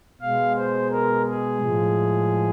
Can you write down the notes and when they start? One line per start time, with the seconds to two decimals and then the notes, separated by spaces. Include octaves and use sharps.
0.21 B2 G#3 F5
0.57 C5
0.91 A#4
1.27 G#4
1.61 A2 F3 G#3